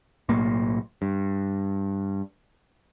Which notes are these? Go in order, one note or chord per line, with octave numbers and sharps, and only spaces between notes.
B1 A2 A#3
G2